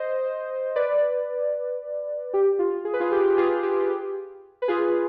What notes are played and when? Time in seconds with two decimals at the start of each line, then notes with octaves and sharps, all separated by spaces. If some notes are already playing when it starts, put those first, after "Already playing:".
Already playing: C5 D#5
0.76 B4 D5
2.34 G4
2.59 F4
2.85 G#4
2.93 B4
3.00 F4 G#4
3.12 G4 B4
3.37 F4 G#4
3.63 G4
4.62 B4
4.68 F4 G#4